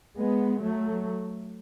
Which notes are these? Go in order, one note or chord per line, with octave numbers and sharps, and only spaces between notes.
G#3 B3
F#3 A3